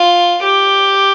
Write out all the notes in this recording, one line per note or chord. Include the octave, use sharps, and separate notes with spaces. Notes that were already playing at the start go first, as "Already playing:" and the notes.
Already playing: F4
G4